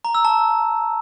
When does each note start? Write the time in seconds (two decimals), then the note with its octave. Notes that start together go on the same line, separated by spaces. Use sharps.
0.05 A#5
0.15 E6
0.25 A5